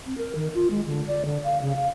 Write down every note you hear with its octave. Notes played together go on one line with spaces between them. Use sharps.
C4
A#4
D#3
F4
G#3
D3
D5
D3
F5
C#3
F5